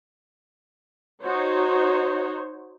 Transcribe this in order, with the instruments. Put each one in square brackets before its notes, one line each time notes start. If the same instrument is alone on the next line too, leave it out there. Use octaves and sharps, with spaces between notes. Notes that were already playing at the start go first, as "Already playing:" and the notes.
[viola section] D#4 F#4 C5 C#5